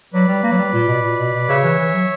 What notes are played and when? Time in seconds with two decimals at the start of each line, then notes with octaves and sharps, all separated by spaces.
0.13 F#3 B4 D5
0.28 G3
0.43 A#3
0.52 F#3
0.58 G3
0.73 A#2
0.88 B2
1.04 A#2
1.19 B2
1.33 B2
1.49 C#3 C#5 E5
1.64 E3
1.78 E3
1.93 F#3